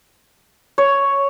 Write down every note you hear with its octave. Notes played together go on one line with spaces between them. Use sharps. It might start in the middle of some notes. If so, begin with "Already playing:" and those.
C#5